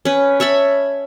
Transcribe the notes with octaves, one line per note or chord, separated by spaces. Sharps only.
C#4 B4
C#5 E5 A5 B5